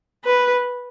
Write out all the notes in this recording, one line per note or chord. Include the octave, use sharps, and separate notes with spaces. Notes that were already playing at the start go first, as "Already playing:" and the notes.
B4